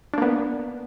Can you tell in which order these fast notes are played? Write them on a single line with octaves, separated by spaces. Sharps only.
D4 A#3 B3